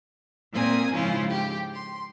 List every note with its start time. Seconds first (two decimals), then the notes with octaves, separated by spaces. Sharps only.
0.53 A#2 A#3 C4 G#5 D#6
0.92 G#2 C#3 F3 C#4 E4 F4
1.29 G4 G5
1.73 C6